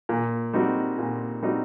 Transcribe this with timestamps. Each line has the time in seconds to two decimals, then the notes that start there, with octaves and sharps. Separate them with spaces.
0.09 A#2
0.53 G3 C4 D#4 F#4
0.98 A#2
1.43 G3 C4 D#4 F#4